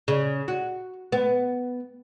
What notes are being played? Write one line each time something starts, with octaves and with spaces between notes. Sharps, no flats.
C#3
F#4
B3